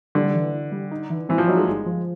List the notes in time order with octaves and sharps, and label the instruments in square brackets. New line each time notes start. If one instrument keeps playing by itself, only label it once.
[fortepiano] D3 [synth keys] G3
[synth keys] E3
E3
G3
D#4
E3
[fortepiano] E3 [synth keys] C4
[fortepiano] F3
[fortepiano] F#3 [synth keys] D#4
[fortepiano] G#3
[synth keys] G1
F3